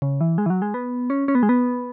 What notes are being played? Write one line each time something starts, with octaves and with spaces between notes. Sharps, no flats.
C#3
E3
G#3
E3
F#3
G#3
B3
C#4
C#4
B3
G#3
B3